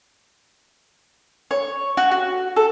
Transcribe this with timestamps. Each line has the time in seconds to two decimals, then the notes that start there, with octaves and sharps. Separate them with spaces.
1.51 C#5
1.97 F#4
2.11 F#4
2.56 A4